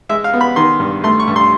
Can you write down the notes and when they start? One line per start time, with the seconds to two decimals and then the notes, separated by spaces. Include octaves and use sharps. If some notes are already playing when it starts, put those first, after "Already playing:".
0.09 G#3 E5
0.24 F5
0.33 B3
0.41 B5
0.56 D#3 C6
0.80 G2
1.04 A3 C6
1.20 C#6
1.27 G2
1.36 C6